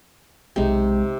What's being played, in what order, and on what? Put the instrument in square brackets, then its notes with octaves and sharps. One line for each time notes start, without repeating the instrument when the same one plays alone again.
[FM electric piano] B1 G#3 G5 [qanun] C3 D#4